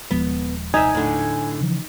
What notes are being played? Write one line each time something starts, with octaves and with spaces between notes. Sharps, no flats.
D#1 F3 G#3 B3
C2 D#4 E5 G#5
A2 D3
C#3 E3 F3